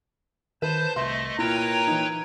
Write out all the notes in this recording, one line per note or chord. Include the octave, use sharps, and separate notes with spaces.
D#3 B4 C5 A5 G6
C2 A3 D#5 E5 C6
A#2 E4 A#4 B4 C#5 G5 A#5
E3 D#4